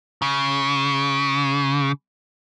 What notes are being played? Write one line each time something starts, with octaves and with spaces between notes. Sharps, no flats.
C#3